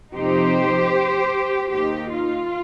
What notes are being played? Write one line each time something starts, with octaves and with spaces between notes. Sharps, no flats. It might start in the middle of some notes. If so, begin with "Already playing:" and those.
F2 C3 F3 C4 D#4 G4 C5
D#2 D#3 A#3 D#4 G4
F4